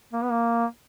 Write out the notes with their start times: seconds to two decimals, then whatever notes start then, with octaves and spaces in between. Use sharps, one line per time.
0.13 A#3
0.22 B3
0.31 A#3